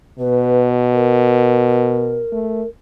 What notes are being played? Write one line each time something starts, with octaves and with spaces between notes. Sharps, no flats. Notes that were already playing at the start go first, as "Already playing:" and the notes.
B2 B4
A#4
A3